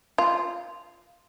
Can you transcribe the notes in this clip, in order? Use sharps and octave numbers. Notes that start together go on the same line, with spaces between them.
F4